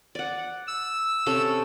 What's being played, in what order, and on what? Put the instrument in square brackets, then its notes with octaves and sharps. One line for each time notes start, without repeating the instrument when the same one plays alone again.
[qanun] D5 F#5
[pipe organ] E6
[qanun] C3 C#4 A4